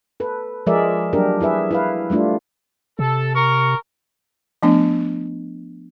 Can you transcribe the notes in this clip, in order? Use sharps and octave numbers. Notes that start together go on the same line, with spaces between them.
A4 B4
F3 G#3 G#4 A#4 D5 E5
F#3 G3 A#3 D4 G4 A#4
E4 G#4 B4 E5
E4 B4 F5
G3 A3 D4 F4
C3 A4
A#4 C#6
F3 A3 B3 D4